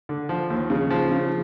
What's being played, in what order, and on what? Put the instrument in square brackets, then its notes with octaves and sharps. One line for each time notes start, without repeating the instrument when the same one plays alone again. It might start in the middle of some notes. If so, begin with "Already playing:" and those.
[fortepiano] D3
F3
D#2
C#3
F3
C#3